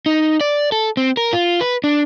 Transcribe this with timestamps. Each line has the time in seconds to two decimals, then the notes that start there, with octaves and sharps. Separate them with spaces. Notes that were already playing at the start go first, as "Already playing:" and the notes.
0.06 D#4
0.41 D5
0.72 A4
0.97 C4
1.17 A#4
1.33 F4
1.61 B4
1.84 D4